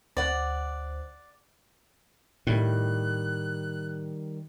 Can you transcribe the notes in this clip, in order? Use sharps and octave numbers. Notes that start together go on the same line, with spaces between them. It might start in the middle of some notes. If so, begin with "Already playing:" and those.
D2 C5 D5 F#5
A2 D#3 G3 F#6